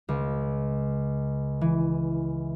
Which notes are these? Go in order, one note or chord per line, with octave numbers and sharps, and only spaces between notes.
C#2
E3